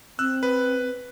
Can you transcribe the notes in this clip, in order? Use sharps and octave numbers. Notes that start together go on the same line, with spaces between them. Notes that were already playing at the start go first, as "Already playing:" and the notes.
C4 E6 F#6
B4